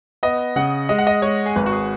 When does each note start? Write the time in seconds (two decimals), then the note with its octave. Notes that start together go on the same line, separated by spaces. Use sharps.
0.23 B3 D#5
0.56 C#3 F#5
0.89 G#3 D#5
0.98 F#5
1.07 D#5
1.22 G#3 C#5
1.46 G#4
1.56 G#1 B4
1.66 F#4
1.72 G#4